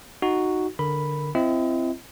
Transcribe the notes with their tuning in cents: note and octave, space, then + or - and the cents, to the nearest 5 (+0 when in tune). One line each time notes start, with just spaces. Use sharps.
D#4 +0 F#4 +0
D3 +0 A#4 +0 B5 +0
C4 +0 E4 +40 D#5 +35